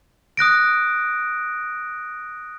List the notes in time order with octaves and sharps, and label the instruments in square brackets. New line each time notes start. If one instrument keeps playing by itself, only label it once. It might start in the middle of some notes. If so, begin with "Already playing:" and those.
[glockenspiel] D#6 F#6 A#6 D7